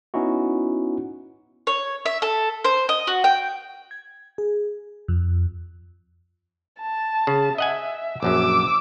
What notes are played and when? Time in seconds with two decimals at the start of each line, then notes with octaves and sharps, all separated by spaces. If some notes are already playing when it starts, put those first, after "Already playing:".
0.14 B3 C#4 D#4 E4 F#4
1.67 C#5
2.06 E5
2.22 A4
2.64 C5
2.89 D#5
3.07 F#4
3.24 G5
3.91 G#6
4.38 G#4
5.08 F2
6.81 A5
7.27 C#3
7.58 D#5 E5 F#5 G#5
8.23 A#1 F#2 F#3 D6 E6